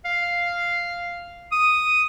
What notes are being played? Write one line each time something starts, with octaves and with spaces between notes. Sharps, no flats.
F5
D#6